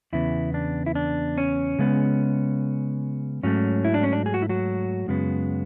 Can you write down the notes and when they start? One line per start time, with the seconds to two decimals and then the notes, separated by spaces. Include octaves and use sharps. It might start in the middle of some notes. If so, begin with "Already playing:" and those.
0.13 E2 C#3 B3 E4
0.54 D4
0.86 E4
0.95 D4
1.38 C#4
1.79 C#3 G#3 B3
3.43 G#2 F#3 A3 C#4
3.85 E4
3.94 D4
4.03 C#4
4.13 D4
4.26 G#4
4.34 F#4
4.42 E4
4.49 F#3 F#4
5.08 F#2 C#3 G#3 B3